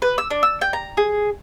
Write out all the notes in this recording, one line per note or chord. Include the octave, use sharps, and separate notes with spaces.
B4
E6
D4
E6
G5
A#5
G#4